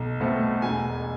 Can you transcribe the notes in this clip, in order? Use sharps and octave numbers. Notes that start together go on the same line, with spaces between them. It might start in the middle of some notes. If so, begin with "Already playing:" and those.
Already playing: B1
B2 A3 C4
E1 G#5